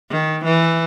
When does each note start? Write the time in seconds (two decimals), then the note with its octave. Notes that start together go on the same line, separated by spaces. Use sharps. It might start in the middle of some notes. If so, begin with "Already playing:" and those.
0.10 D#3
0.45 E3